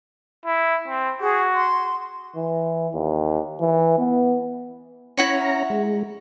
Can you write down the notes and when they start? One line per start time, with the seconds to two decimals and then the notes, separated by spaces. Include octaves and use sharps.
0.46 E4
0.88 C4
1.21 F#4 G#4
1.54 C6
2.36 E3
2.94 D#2
3.61 E3
3.98 B3
5.17 C#4 E4 F#5 A#5 C#6
5.70 G#3